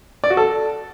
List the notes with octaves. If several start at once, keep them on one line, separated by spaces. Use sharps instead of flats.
D5
F#4
A4